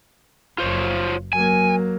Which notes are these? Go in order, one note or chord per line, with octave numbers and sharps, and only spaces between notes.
F#1 F4 C5 C#5
F#3 A#3 G#5